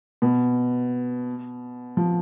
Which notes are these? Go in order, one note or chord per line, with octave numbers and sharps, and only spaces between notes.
B2
F3